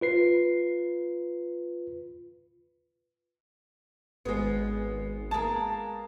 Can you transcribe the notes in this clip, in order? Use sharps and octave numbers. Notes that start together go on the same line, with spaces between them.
F4 B4 C7
G#1 G#3 B3 G#4
A#3 G#4 A5